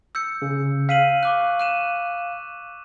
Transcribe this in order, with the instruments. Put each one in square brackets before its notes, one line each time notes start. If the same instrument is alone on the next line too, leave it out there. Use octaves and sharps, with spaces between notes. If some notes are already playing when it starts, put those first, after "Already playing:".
[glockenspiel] E6 G6 C#7
[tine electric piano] C#3
[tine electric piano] F5 [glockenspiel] B6 D#7 F#7
[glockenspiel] C#6 D6 F#6
F#6 D#7 E7